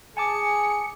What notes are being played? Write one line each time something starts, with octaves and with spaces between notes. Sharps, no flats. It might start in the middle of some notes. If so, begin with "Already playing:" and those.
G#4 G#5 A5 D6 C#7